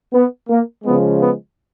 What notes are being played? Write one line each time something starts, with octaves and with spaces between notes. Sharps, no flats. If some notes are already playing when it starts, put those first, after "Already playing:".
B3
A#3
C#3 F3 G#3 B3
B3